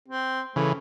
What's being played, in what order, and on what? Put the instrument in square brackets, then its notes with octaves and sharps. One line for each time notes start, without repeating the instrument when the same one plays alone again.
[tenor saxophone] C4
[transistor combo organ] C#3 E3 [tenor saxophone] A3